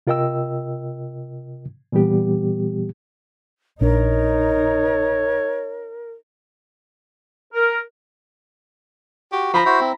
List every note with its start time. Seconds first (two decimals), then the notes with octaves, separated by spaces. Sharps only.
0.07 C3 F4 A#4 D#5 G5 E6
1.92 A#2 E3 G3 B3 G4
3.81 A#1 D4 D#4 A#4 C#5
7.53 A#4
9.32 F#4 G4
9.54 F3 A#5 B5
9.66 E4 F#4 C5
9.80 C4